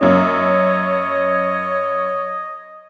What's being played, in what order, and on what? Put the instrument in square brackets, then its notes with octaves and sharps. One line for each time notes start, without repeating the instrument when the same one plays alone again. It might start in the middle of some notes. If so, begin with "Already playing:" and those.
[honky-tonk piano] F#2 A#3 C#4 [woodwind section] C#5 [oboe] D#5